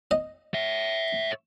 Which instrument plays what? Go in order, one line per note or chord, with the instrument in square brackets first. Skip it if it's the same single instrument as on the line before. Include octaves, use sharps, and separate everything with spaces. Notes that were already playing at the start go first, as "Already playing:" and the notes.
[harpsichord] D#5
[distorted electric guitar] C#5 E5